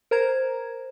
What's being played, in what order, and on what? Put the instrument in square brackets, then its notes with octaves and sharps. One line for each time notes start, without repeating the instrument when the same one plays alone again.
[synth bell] A#4 C5 A#5 G#6